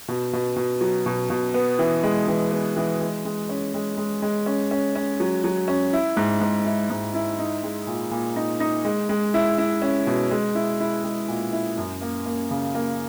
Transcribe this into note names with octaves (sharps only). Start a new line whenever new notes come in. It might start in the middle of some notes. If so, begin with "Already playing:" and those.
B2
B2
B2
F#3
B2
B2
B3
E3
G#3
E3
B3
E3
G#3
G#3
C#4
G#3
G#3
G#3
C#4
C#4
C#4
F#3
F#3
C#4
E4
G#2
G#2
E4
G#2
E4
D#4
G#3
A#2
A#2
D#4
D#4
G#3
G#3
E4
E4
C#4
B2
G#3
E4
E4
G#3
A#2
E4
F#2
A#3
A#3
C#3
A#3